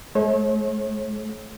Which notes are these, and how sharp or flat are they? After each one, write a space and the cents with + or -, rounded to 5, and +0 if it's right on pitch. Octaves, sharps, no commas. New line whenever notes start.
A3 -45 C#5 -40